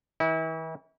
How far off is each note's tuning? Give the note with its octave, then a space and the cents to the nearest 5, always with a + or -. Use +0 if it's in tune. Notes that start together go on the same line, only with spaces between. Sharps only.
E3 -40 E4 -35